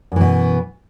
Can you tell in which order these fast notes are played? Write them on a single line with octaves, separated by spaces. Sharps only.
F#2 E3 B2